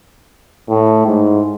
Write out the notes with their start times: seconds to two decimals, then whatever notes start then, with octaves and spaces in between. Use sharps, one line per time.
0.70 A2
1.07 G#2